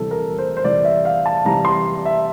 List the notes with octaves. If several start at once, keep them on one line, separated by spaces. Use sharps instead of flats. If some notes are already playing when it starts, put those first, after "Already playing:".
Already playing: C3 E3 G3 A4
A#4
C5
C5
C3 E3 G3 D5
E5
F5
A5
C3 E3 G3 A#5
C6
E5